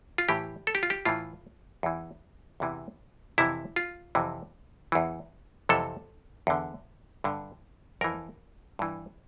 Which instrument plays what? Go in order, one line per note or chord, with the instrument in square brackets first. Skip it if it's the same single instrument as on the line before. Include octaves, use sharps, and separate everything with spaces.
[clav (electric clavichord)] F4
A2 E3 G4
A4
G4
F4
G4
A2 E3 F4
E2 E3
E2 C3 E3
F2 C3 E3 E4
F4
F2 C3 E3
E2 E3
F2 C3 E3 A4
E2 D3
G2 D3
F2 E3 A#4
G2 E3